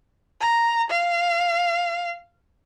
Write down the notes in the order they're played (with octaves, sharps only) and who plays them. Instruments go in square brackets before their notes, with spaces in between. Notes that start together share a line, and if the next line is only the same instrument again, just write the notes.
[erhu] A#5
F5